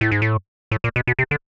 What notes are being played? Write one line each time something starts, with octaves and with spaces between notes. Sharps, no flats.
A2
G#2
A2
A2
A#2
B2
B2
C3
D3